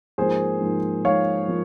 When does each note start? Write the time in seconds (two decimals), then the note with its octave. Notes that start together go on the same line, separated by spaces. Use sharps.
0.18 G#2 F3 A#3 G#4 C5
0.61 G#2 F3 A#3
1.04 G#2 F3 A#3 C#5 F5
1.48 F3 A#3